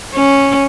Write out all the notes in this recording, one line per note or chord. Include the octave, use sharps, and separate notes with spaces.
C#4